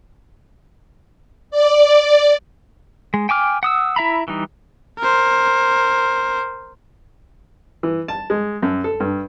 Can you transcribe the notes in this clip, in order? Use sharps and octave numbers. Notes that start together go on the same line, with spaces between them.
D5
G#3
G5 G#5 D6 F6
F#5 D#6 E6
E4 E5 A#5 B5
E3 G3 D#4
A#4 C5
E3
A5
G#3
F#2
A4
G2